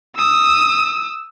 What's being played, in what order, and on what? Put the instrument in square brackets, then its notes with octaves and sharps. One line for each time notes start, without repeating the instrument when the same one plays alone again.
[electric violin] D#6 E6